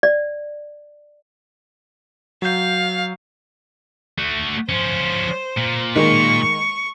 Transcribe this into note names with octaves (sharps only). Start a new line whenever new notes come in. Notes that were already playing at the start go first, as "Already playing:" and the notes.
D5
F#3 F5 G6
A3 F#4
F3 C#4 C5
A#2
D#3 G#3 A#3 C#6